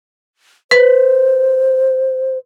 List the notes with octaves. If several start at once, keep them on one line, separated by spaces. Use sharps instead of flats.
B4 C5